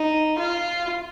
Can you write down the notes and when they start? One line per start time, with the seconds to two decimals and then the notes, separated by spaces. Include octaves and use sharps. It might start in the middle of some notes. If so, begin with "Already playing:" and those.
Already playing: D#4
0.38 F4